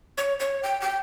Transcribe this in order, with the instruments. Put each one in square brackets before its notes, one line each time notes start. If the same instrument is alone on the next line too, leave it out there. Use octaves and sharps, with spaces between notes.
[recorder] C#5
C#5
G5
G5